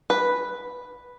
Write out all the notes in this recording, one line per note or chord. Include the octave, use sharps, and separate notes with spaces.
B4